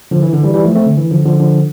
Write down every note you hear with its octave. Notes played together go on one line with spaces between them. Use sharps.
D3 F3
E3
D3
E3 G3
E3 G3
F3 A3
A3 C4
D3
E3
D3 F3
D3 F3
D3 F3